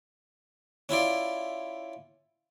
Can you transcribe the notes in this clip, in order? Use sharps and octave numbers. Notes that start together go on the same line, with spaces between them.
C#4 E4 F4 D5